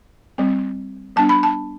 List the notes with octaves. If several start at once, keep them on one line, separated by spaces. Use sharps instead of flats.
G3 C4
G3 B3 D4 A5
B5
A5